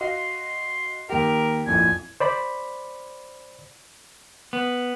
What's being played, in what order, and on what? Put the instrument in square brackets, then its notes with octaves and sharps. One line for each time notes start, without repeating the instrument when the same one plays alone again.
[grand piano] F#4 D#5 F5 [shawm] C6
[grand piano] D#2 G4 [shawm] A#4
[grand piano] A#1 F2 A2 [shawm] G#5
[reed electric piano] C5 D5 B5
[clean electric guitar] B3